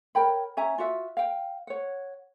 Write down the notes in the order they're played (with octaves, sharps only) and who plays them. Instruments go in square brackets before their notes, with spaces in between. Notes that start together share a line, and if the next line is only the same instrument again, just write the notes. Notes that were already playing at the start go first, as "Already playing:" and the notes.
[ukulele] A#4 C#5 G5 B5
C#4 E5 G#5 A#5
F4 F#4 E5
F5 G5
C#5 F#5